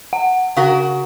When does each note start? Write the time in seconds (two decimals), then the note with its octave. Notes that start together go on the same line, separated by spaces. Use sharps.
0.13 F#5
0.56 C#3 F#4 A#4